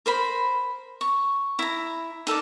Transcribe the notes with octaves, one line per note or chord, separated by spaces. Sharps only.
A#4 C5 B5
C#6
E4 A#5
D#4 A4 A#4 D5